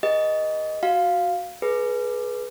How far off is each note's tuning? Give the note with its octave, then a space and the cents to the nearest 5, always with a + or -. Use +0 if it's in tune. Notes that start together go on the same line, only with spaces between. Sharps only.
G#4 -40 B4 -45 D#5 +0
F#4 +0 F5 +0
G#4 +25 B4 -15